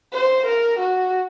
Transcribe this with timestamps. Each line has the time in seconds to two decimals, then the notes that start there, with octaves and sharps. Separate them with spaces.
0.13 C5
0.46 A#4
0.79 F#4